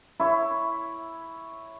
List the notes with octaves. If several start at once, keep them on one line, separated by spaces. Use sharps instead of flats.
E4 C#5